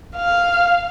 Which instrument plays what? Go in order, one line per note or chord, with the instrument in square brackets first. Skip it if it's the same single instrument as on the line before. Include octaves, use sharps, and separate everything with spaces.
[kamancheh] F5